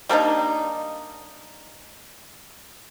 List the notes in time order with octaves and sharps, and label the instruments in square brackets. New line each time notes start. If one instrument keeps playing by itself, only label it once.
[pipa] G3 A#3 D4 D#4